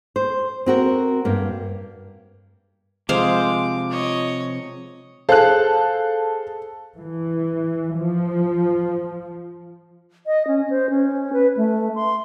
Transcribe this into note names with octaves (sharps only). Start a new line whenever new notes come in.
C5
C4 F#4 A#4
G2 A#3
C3 F3 G#3 C5 F5 D6
C#5 D#5
G#4 A4 C5 F5 F#6
E3
F3
D#5
C#4
C5
C#4
B4
A3
C6